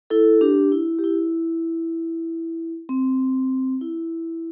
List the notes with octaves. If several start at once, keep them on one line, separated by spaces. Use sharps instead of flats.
E4 A4
D4 G4
E4
G4
E4
C4
E4